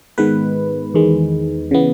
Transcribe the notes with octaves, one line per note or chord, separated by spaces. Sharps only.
G#2 D#3 G#3 B3 B4
E2 D#3 G#3
C#3 E3 B3